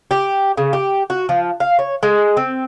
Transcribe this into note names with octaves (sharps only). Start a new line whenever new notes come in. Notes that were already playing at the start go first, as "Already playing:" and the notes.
G4
C#3
G4
F#4
F3
F5
C#5
G#3
C4